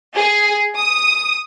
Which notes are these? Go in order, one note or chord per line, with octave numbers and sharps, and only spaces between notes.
G#4
D#6